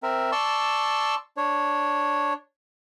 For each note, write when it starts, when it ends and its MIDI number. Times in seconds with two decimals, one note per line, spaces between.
0.03 0.31 60
0.03 0.31 70
0.03 0.31 76
0.32 1.15 74
0.32 1.15 81
0.32 1.15 84
0.32 1.15 85
0.32 1.15 88
1.37 2.33 62
1.37 2.33 73